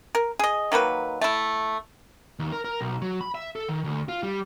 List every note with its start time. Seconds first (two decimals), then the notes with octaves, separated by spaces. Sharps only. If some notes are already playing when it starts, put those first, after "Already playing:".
0.15 A#4
0.39 G#4 D#5
0.72 D#3 F#3 A#3 B4
1.21 A3 E4
2.39 D#2
2.52 A#4
2.65 A#4
2.81 B1
3.02 F#3
3.21 B5
3.35 E5
3.56 A4
3.68 D#3
3.84 D2
4.09 F4
4.23 G3